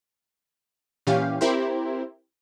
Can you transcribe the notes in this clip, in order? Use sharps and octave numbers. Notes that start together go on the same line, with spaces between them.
A#2 E3 C#4 G4 F5
C4 E4 G4 A#4 C5